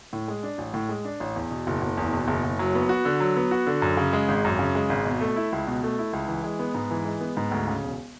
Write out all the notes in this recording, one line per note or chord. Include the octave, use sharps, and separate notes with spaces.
A2
G#3
D4
A1
A2
G#3
D4
A1
E2
B2
F#1
F#1
E2
B2
F#1
F#1
F#3
B3
F#4
D3
F#3
B3
F#4
D3
F#2
C#3
G#3
G#1
F#2
C#3
G#3
G#1
B2
A3
E4
C#2
B2
A3
E4
C#2
E3
G#3
B3
G#2
E3
G#3
B3
G#2
D2
C#3
E1